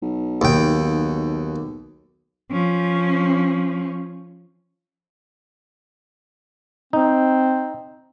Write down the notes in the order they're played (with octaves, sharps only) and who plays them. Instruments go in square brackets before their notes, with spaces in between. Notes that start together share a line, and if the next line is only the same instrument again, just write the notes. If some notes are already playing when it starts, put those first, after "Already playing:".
[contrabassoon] B1
[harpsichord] D#2 G5
[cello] F3 C#4
[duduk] C4 [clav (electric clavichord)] D#4